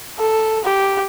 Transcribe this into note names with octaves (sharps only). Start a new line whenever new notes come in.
A4
G4